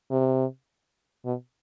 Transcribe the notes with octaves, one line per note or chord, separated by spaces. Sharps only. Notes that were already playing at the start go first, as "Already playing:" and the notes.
C3
B2